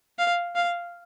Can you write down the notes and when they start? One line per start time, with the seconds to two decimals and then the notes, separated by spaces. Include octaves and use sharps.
0.18 F5
0.55 F5